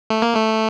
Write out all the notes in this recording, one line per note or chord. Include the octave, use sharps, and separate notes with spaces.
A3
A#3
A3